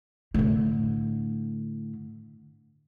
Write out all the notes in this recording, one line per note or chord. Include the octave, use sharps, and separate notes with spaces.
A2 D3